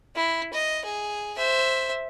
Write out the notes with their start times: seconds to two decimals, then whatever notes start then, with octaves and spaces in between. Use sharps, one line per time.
0.15 E4
0.53 D#5
0.85 G#4
1.37 C5 E5